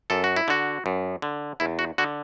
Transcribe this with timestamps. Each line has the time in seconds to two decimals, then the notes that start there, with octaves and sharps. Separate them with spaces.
0.10 F#2 A4
0.24 F#4
0.36 E4
0.48 D3 F#4
0.86 F#2
1.22 D3
1.60 E2 E4
1.79 F#4
1.98 D3 F#4